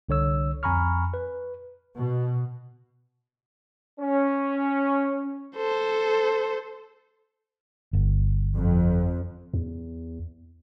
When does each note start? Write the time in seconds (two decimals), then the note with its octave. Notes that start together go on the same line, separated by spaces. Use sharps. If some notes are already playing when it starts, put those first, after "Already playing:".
0.09 C2 D3 C#5 E6
0.63 F2 G#5 A#5 B5 C#6 F6
1.14 B4
1.97 B2
4.00 C#4
5.56 A4 C5
7.93 G1
8.56 F2
9.54 E2